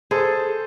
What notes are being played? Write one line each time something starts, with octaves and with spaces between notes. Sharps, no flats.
G#4 A4 C5